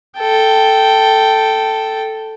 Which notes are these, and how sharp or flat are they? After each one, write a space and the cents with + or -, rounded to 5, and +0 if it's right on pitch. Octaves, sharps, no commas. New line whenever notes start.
A4 +0 G5 -5